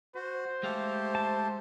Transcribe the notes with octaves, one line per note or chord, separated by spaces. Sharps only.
F#4 C5
G#3 A3 G4 A4 F5
A5